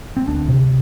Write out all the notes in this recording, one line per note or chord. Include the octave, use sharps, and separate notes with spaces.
C4
D2 D4
C3